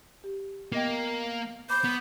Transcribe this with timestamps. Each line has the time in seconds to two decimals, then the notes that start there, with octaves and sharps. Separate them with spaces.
0.24 G4
0.72 A#3 B3 D#5 G5
1.70 B5 D6 G6
1.84 B3